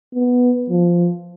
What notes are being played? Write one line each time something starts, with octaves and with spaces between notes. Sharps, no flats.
B3
F3